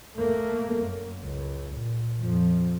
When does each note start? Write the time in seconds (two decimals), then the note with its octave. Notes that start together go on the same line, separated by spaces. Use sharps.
0.16 A3 A#3
0.81 F#2
1.24 C#2
1.75 A#2
2.21 F2 F3